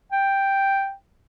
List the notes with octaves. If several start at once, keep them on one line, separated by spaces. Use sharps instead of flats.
G5